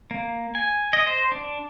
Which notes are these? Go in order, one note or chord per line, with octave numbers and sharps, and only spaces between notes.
A#3
G#5
D#5
C5
D4